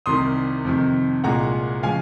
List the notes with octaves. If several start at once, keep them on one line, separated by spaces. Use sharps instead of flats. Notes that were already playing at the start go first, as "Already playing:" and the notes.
C2 C3 D#3 C6 D#6
F2 C3 D#3
C2 A#2 G#3 F#5 A#5
C#3 F3 G#3 F5 G#5